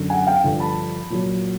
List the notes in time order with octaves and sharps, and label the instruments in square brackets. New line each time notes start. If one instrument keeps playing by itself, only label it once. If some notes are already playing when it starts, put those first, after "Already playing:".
Already playing: [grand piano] F#2 D3 F#3
F#5 G#5
F5 G5
G2 D3 F3
A5 B5
A#2 F#3